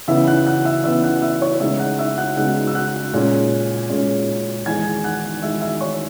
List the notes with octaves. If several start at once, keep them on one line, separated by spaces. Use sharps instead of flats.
C#3 E3 B3 E5 E6
F#5 F#6
F#5 F#6
E5 E6
C#3 E3 B3 E5 E6
F#5 F#6
E5 E6
C#5 C#6
C#3 G#3 B3 D#4 E5 E6
F#5 F#6
E5 E6
F#5 F#6
C#3 G#3 B3 D#4 F#5 F#6
E6
F#5 F#6
A#2 G#3 C#4
A#2 G#3 C#4
E2 D#3 G#3 G#5 G#6
F#5 F#6
E2 D#3 G#3 E5 E6
E5 E6
C#5 C#6